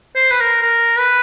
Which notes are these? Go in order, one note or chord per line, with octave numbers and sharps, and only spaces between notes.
C5
B4
A#4
A#4
B4